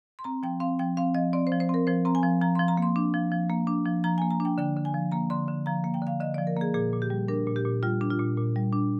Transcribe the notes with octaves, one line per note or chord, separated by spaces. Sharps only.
C6
C4 A#5
F3 G5
C4 F5
F3 G5
C4 F5
F3 D#5
C4 D5
C5
F3
C5
C4 A#4
F3 C5
C4 A#5
G#5
F3
F3 A#5
C6
F3
A#5
A#3 C6
D4
F3
F3
A#3
D4
F3
F3 A#5
G#5
A#3
A#5
D4 G5
D3 G5
D3
G#5
F3
A#3 A#5
D3 C6
D3
F3 A#5
A#3
G5
D3 F5
D3 D#5
D5
F3
A#4
A#3 G#4
A#2 G#4
A#2
G4
G3
D4 A#4
A#2
G4
A#2
G3 F4
D4
F4
A#2
A#2
G3
D4